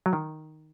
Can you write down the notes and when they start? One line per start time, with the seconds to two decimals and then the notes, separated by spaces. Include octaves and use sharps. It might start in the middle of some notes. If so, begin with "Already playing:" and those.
0.06 F#3
0.13 D#3